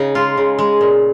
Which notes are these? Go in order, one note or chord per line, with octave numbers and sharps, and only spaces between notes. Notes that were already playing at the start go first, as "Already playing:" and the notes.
Already playing: C#3 D#4
G#3 F4
C#3
G#3
A#2